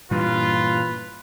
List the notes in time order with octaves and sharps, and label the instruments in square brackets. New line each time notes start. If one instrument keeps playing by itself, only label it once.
[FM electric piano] G2 [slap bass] A#2 E3 [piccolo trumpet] F4 [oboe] B4